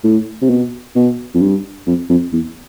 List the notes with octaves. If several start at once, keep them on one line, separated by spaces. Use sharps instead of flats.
A2
C3
B2
B2
F2
G2
F2
F2
E2